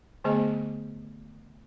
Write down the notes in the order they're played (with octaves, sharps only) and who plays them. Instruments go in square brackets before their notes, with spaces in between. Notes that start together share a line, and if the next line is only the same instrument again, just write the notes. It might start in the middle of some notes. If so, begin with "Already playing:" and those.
[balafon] D3 A3 B3 G#4 D#5